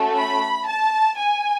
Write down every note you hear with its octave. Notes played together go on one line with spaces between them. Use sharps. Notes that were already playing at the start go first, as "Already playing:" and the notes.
Already playing: A3 C#4 F#4 A4
B5
A5
G#5